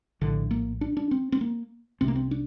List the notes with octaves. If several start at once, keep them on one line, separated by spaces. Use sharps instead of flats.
A#1 A2 D3
A#3
D4
D4
C4
C4
A#3
C2 C3 C4
A#3
C4
D4